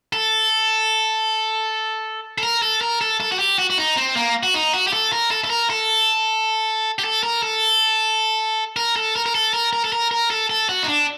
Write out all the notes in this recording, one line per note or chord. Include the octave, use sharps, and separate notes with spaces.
A4
A4
A#4
A4
A#4
A4
A4
F#4
G4
F#4
F#4
D#4
C4
A#3
F#4
D#4
F#4
G4
A4
A#4
A4
A4
A#4
A4
G4
A4
A#4
A4
A#4
A4
A#4
A#4
A4
A#4
A#4
A4
A#4
A#4
A4
A4
F#4
D#4
D4